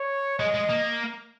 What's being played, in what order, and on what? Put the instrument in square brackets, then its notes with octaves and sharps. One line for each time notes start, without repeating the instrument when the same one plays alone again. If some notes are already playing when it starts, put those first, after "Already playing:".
Already playing: [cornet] C#5
[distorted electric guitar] G#3 [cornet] D#5
[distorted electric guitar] G#3
A#3